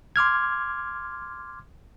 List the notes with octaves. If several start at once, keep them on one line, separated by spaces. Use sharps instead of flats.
C6 D6 F6 G#6